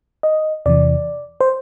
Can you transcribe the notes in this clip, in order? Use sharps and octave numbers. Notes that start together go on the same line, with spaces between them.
D#5
E2 C3 E3 D5
C5